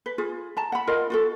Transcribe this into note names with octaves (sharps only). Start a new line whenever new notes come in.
B4
F4 G#4
A5 A#5
F#5 B5
F4 A#4 D#5 F5
F4 F#4 A4